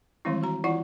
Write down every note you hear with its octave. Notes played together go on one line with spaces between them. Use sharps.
D#3 E3 G3 G#3 C4 E4
F#4 A#5
E3 E4 F4 D5 F#5